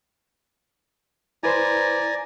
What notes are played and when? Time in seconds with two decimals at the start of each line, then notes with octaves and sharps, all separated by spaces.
1.43 E4 B4 C5 D5 G#5 A#5